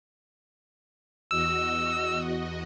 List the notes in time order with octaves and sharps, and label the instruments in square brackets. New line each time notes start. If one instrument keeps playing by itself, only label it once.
[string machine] E2 F#4 D#5 [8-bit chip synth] E6